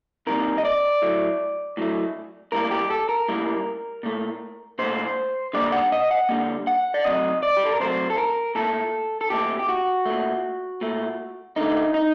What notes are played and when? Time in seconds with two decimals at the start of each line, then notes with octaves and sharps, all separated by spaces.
0.27 C3 D#3 G3 A#3 A#4
0.58 D#5
0.65 D5
1.02 A2 F#3 A3
1.77 A2 F#3 A3
2.52 A2 G3 A#3 A#4
2.71 G4
2.90 A4
3.09 A#4
3.28 A2 G3 A#3
4.03 A#2 A3
4.79 A#2 A3 C5
5.53 D3 G3 A#3 D5
5.72 F#5
5.92 D#5
6.11 F#5
6.29 D3 G3 A#3
6.67 F#5
6.94 D5
7.04 C3 F#3 A3 D#5
7.43 D5
7.57 G4
7.65 A4
7.72 A#4
7.80 C3 F#3 A3 C5
8.10 A4
8.18 A#4
8.55 A#2 A3 A4
9.21 A4
9.30 A#2 A3 G4
9.59 G4
9.69 F#4
10.06 A#2 A3
10.81 A#2 A3
11.56 D3 A3 D#4
11.94 D#4